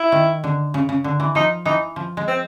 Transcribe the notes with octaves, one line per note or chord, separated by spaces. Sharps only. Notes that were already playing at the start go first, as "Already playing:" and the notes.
Already playing: E4
D#3
D3
C#3
C#3
D3
E3
F3 D#4
E3 D#4
F3
G#3
C4